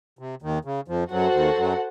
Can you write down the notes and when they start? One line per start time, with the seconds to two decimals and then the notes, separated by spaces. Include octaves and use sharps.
0.19 C3
0.42 D#2 D#3
0.65 C#3
0.88 F2 F3
1.11 F#2 F#3 F#4 A4 C5 F#5
1.34 D#2 D#3
1.57 F#2 F#3